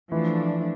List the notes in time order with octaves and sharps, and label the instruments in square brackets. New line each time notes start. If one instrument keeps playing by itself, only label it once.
[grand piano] E3 [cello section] F3 A3 D4